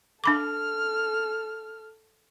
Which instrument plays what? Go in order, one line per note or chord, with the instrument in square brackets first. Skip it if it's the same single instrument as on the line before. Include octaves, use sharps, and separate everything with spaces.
[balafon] D4 B5 D6 [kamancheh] A4 F6